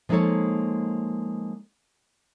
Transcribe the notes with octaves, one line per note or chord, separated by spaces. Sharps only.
F3 G#3 A#3 D#4 A4 C#5